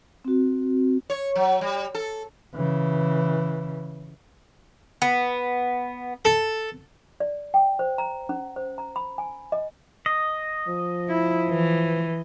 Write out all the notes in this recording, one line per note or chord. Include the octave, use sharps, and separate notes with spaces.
C4 F#4
C#5
F#3
G3
A4
C#3 E3
B3
A4
D5
G5
C5
A#5
C#4
C5
A#5
B5
G#5
D#5
D#5
F3
E4
E3